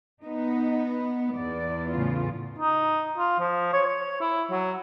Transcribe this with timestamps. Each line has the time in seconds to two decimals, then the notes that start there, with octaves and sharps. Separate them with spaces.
0.24 B3 D#4
1.36 E2 D5
1.91 A2 C#3 F4
2.59 D#4
3.18 F4
3.40 F3
3.73 C#5
3.86 C#5
4.21 E4
4.51 F#3